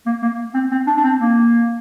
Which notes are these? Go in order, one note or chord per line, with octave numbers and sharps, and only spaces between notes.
A#3
A#3
C4
C4
D4
D4
C4
A#3